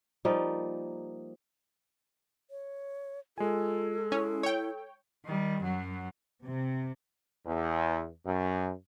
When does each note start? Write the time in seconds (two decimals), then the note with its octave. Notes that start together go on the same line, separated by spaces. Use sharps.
0.25 F3 G3 A#3 D#4
2.50 C#5
3.38 G#3 F4 A4 G#5
4.12 C#4 E4
4.43 C#5 G5
5.25 D#3 G3
5.61 F#2 F#3
6.45 C3
7.46 E2
8.25 F#2